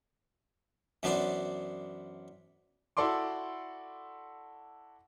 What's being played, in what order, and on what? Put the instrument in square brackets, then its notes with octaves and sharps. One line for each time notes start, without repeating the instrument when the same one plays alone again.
[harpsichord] F#2 E3 B3 D4 C5 D5
[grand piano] E4 F#4 A4 D5 C6 D6